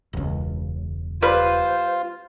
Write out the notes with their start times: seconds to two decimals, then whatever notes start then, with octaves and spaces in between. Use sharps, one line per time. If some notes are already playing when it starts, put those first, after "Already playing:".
0.13 E1 C#2
1.22 G3 F4 B4 C5